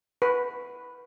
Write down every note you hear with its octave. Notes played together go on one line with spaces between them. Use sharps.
B4